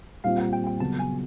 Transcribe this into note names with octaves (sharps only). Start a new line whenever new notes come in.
A#2 G3 C4 F4 F5
F#5
G5
G5
C#3 F#3 B3 A5
G#5